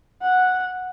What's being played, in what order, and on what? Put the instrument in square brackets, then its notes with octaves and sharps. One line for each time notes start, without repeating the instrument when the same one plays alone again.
[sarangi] F#5